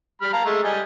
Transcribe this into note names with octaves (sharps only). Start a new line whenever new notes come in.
G3 B5 F6
F5 A5 A#5
G#3 A3
G3 D#5 G#5